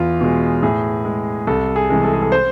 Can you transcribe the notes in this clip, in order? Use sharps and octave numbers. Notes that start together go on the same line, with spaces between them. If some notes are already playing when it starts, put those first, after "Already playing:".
Already playing: E2 F4
B2 G#3
A2 G#4
G#3
C2 A4
G#4
C3 E3 G#3
A4
G#4
A4
C5